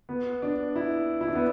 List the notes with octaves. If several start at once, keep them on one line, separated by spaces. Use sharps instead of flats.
B3
D4
E4
E4
D4
B3